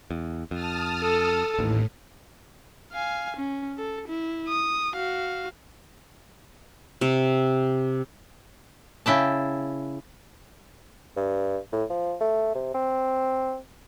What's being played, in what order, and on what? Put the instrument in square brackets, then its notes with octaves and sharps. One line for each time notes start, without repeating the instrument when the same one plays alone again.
[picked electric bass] E2
[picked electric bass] F2 [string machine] A5 D#6 F6
[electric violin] A4
[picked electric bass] A1 D#2 [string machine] A2
[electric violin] F5 G#5
C#4
A4
E4
D#6
F#4 F5
[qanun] C3
[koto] C#3 E4 G5 A5
[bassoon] G2
A2
F3
A3
C3
C4